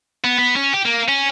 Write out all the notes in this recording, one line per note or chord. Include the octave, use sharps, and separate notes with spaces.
B3
B3
C#4
G4
A#3
C#4